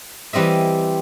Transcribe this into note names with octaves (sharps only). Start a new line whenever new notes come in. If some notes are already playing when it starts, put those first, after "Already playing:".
E3 G3 C4 D#5 E5